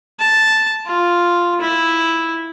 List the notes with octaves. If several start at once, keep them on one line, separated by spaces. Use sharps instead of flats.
A5
F4
E4